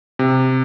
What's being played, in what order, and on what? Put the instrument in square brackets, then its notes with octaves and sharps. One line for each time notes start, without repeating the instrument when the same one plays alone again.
[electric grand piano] C3